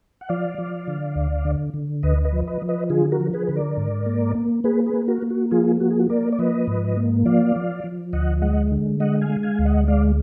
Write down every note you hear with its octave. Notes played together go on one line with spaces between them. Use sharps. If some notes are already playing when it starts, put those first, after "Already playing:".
F#5
F3 D5 F5
F3
D3
D2
D3
D3
D2 B4 D#5
B4 D#5
F3
B4 D#5
F3
B4 D#5
D3 F4 G#4
F#4 A#4
F3
G#4 B4
D3 B4
A#4 D5
G#2
A#3
A#3
A#3 G#4 B4
G#4 B4
A#3
F#4 A#4
A#3
F#4
F3 F4 G#4
A#3 F#4
G#4
F#4
A#3 A#4 D5
D5
F3 B4 D#5
G#2
A#3
F3 D5 F5
F3
F3
D2 D#5 F#5
G#3 D#5 F#5
D3
G#3 D#5 F#5
F5 G#5
G#3
F5 G#5
D2 F5
D#5 F#5
G#3 D5 F5